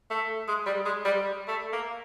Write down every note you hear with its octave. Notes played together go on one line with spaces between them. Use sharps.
A3
G#3
G3
G#3
G3
A3
A#3